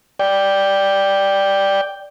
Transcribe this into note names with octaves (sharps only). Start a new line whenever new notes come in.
D5 G5